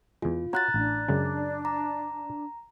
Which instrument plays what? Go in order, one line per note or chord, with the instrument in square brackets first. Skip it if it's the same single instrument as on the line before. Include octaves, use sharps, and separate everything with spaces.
[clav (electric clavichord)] E2 G#3 [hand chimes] F4
[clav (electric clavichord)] F4 F#4 C#5 [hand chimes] A#5 F#6 A6
[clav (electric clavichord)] A1 [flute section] D4
[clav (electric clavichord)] F#2 C#3 G#3
[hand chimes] A#5